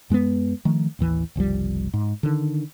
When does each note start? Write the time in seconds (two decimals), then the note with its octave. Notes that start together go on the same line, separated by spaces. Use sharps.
0.10 F#2 G#3 A#3 B3
0.65 D#3 F3 A3
0.99 A1 D#2 E3
1.36 F#1 C2 F3 G3
1.94 G#2
2.23 D3 D#3